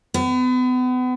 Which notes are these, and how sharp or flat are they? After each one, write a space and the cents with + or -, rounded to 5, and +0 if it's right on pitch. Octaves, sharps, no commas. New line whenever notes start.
B3 +35